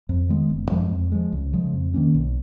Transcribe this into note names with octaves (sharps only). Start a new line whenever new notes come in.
F2
D#3 G#3 B3
F#1
F#2 F3 G#3
F2
F3 G#3
C#2
C#3 F3 G#3
F2
D#3 A#3 C#4
B1